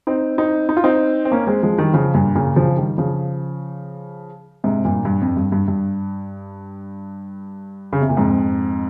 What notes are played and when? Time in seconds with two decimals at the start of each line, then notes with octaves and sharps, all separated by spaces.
0.07 C4 D#4
0.38 C4 D#4
0.69 D#4
0.77 F4
0.84 C4 D#4
1.25 C4
1.32 A#3 C#4
1.47 G#3 C4
1.63 F3 G#3
1.78 D#3 G3
1.93 C#3 F3
2.14 G2 A#2
2.35 A#2 C#3
2.56 C#3 F3
2.77 D#3 G3
2.98 C#3 F3
4.64 G#2 C3
4.85 G2 A#2
5.05 G2
5.22 F2
5.37 G2
5.52 G2
5.68 G2
7.93 C#3
8.01 C3
8.09 A#2
8.17 F2 G#2